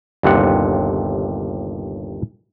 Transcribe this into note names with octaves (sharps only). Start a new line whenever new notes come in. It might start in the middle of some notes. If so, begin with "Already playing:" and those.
G1 D#2 C3 F#5